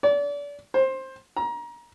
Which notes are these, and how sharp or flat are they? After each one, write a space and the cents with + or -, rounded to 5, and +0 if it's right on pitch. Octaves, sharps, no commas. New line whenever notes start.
D5 -35
C5 +15
A#5 +25